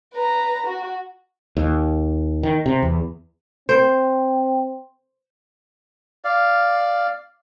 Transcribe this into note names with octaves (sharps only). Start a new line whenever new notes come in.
B4 A#5
F#4
D#2
D#3
C3
E2
C4 C5
D5 F5